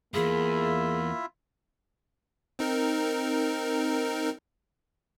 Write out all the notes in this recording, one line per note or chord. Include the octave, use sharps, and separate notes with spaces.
E2 G2 A#3 E4 F4 G#4 E5
C4 D#4 A#4